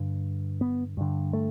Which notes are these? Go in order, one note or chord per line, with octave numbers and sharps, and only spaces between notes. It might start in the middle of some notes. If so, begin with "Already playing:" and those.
Already playing: G2 D3
B3
G2 D3
A3